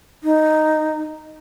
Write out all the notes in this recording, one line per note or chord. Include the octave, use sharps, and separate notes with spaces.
D#4